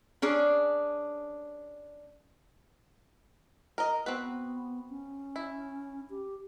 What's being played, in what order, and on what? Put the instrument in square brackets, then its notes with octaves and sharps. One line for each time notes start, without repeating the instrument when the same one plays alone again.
[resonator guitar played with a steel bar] C#4 D4 G#4
[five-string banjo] A#4 D#5
[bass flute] B3 [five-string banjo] C4 F#4 B4
[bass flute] C#4
[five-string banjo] E4
[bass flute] G4